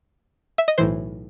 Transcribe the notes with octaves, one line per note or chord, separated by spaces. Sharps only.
E5
D#5
B1 A2 E3 C5